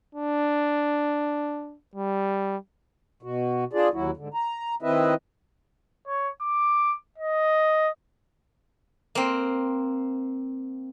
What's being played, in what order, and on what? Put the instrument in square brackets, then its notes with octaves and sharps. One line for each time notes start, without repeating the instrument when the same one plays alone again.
[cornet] D4
G3
[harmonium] B2 F#4
D4 F4 G#4 D5
D#2 F#3 E4 F#4
G#2 D3
A#5
D#3 C4 E4 B4 D#5 E5
[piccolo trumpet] C#5
D6
D#5
[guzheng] A#3 C4